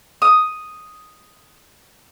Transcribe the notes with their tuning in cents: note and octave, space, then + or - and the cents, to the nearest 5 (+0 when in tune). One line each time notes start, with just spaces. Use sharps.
D#6 +0